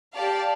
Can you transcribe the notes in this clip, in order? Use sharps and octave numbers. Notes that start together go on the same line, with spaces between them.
G4 D5 F5 A5